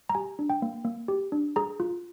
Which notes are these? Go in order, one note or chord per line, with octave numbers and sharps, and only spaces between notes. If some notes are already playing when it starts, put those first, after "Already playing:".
A#5
G4 G#5
D4
G5
A#3
A#3
G4
D4
G#4 A#5
F4